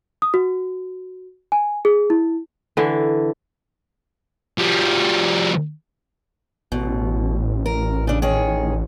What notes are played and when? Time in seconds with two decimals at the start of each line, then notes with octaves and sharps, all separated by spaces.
0.22 D#6
0.34 F#4
1.52 G#5
1.85 G#4
2.10 E4
2.77 D3 E3
4.58 F3 G3
6.72 A1 B2
7.66 A#4
8.07 C#3 D4
8.22 D#3 G#4 C#5